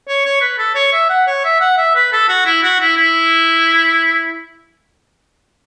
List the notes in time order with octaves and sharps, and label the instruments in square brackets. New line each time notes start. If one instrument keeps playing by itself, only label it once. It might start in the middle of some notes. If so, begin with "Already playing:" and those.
[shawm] C#5
C#5
B4
A4
C#5
E5
F#5
C#5
E5
F#5
E5
B4
A4
F#4
E4
F#4
E4
E4